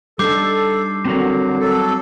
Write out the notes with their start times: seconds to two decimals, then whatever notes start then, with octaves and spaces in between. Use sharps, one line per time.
0.19 G3 D4 D#4 A4 D6 G6 C7
1.05 D3 F#3 C4 F#4 A#4
1.59 F#3 A4